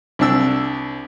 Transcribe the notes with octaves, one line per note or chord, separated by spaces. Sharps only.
C2 D4 E6